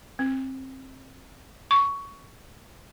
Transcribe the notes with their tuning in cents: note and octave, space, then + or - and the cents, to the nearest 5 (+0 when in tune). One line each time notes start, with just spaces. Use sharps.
C4 +20
C#6 +15